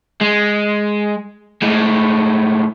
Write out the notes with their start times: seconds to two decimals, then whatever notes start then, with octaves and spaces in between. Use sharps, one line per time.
0.21 G#3
1.62 A2 G#3